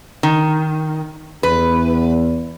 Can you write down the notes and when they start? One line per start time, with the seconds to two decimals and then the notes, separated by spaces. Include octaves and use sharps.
0.23 D#3
1.43 E2 B4